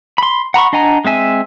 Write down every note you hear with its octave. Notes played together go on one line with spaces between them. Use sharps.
B5 C6
F#5 A#5 B5 C#6
D4 D#5 F#5 G#5 A#5
G#3 C4 E5 G#5